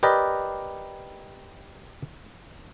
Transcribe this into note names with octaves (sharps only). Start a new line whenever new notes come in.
G4 A#4 B4 D5 D#5